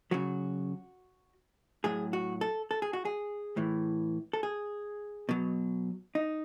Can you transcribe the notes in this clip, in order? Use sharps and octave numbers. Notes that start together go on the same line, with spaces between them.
C#3 F#3 F#4
A2 F#3 G#4
F#4
A4
A4
G#4
F#4
G#4
A2 E3
A4
G#4
B2 F#3
D#4